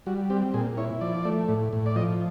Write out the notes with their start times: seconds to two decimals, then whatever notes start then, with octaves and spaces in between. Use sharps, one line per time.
0.06 G3 F#4
0.30 C4 G4
0.54 A#2 G#4
0.77 E4 C#5
1.01 F3 D5
1.25 A3
1.48 A2
1.73 A2
1.86 D5
1.96 F3 D#5